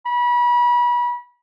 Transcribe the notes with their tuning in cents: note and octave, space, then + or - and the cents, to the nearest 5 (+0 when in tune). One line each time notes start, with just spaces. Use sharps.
B5 -35